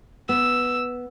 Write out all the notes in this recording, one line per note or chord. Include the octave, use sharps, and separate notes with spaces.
B3 E6